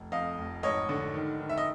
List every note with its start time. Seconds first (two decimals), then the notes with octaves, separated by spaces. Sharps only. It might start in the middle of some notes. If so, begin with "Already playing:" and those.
Already playing: F1
0.12 F2 D#5 F5
0.38 F1
0.63 G#1 C#5 D#5
0.89 D3
1.14 D#3
1.39 D#3
1.50 E5
1.58 D#5